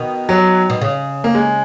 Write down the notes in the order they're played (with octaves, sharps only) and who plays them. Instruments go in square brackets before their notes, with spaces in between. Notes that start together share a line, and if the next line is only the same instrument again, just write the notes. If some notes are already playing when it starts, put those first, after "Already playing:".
Already playing: [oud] B2 D#3
[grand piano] F#3
[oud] B2
C#3
[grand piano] A#3
G#3